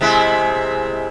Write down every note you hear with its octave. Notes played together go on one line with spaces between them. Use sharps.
C3 G#3 E4